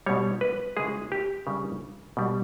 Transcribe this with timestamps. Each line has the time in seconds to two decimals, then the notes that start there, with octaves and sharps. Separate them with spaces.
0.06 B2 G3 C#5
0.41 B4
0.77 C#3 G#3 G#4
1.12 G4
1.47 C#3 G3
2.17 B2 G3